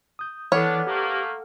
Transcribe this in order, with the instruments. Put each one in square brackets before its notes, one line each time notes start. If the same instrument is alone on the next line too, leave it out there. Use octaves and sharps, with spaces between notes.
[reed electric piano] D#6 G6
[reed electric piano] E3 [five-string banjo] B3 C#5 [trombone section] D4 [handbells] A4 F#5 F6
[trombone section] A3 A#3 [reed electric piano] G4 D6